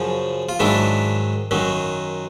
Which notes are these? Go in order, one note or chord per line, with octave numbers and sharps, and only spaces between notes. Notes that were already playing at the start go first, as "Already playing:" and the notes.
Already playing: F#2 C#3 F3
F4
G#2 D#3 F#3 D4 E4
F#2 D#3 F#3